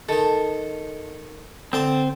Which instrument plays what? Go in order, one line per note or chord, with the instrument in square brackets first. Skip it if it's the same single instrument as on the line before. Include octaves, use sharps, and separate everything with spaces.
[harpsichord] D#3 D#4 [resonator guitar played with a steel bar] A4
[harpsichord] D3 G5 A5 [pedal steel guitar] C4